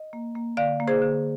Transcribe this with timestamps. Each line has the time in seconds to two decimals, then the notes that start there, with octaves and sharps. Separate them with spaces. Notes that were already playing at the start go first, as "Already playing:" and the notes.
Already playing: D#5
0.13 A#3
0.35 A#3
0.57 D3 D5 F5
0.80 A#3
0.87 G#4 C5
1.02 D3